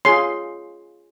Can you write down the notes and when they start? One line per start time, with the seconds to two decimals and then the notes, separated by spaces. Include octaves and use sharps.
0.05 F4 G#4 C#5 C6